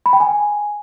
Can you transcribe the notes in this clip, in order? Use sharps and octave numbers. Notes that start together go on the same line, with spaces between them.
B5
G5
G#5